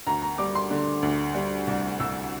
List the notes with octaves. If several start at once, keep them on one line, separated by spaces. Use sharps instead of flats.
D2 A#5
A#5
G3 D6
C6
D3
D2
G3
C2
C2 E6